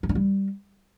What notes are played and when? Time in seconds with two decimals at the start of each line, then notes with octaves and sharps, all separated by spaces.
0.03 C4
0.09 D4
0.15 G3